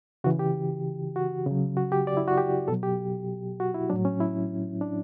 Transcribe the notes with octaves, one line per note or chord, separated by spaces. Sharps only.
C#3 E3 F#4
G4
F#4
C#3
F#3
F#4
G4
D5
E4
F#4
G4
B2 F#3 A4
G4
F#4
E4
A2 F#3 D4
C#4
E4
D4